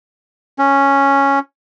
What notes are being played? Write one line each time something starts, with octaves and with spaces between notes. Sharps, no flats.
C#4